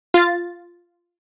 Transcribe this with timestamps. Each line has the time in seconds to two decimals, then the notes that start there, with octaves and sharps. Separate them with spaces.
0.14 F4 A6